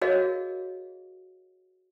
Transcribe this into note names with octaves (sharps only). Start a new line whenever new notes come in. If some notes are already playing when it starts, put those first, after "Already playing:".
F#4 G#4 A#4 C#5 D#5 F5